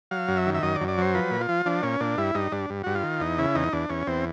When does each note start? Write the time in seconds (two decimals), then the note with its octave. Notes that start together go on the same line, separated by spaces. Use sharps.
0.11 F#3 F5
0.28 F#2
0.37 E5
0.46 D#3
0.54 E5
0.63 F#2 D#5
0.75 D5
0.81 F#2
0.88 D5
0.98 F#3 C5
1.15 F3 B4
1.31 A#2
1.41 F4
1.49 F3
1.66 F3 D4
1.83 A#2 C#4
2.00 A#2 D4
2.18 G2 E4
2.35 G2 D#4
2.52 G2 D4
2.70 G2
2.83 G2 F#4
2.95 F4
3.04 D#3
3.20 E2 D#4
3.38 C#3 E4
3.55 E2 D#4
3.72 E2 D4
3.89 E2 C#4
4.07 E2 C4